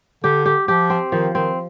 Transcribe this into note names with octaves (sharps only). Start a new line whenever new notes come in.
D3 G4
G4
F3 G4
C4
D#3 F3
D#3 C4